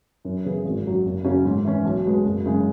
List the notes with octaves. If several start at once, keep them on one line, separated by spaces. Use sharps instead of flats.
F#2
C#3 E3 B3 G#4
G#1
F#2 F#3
F#1
F#2 C#3 F#3 C#4
G#2
E3 C#4
B1
B2 G#3 B3
F#1
F#2 C#3 G#3